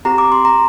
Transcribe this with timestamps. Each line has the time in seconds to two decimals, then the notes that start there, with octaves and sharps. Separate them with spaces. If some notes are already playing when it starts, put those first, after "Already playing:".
0.05 C4 G4 A#5
0.18 D6
0.32 C6
0.45 A#5